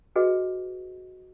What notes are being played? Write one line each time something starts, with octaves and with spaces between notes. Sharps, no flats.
F#4 G#4 B4 D#5